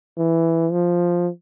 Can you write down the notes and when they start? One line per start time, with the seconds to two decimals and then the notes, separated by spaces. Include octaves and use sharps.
0.18 E3
0.72 F3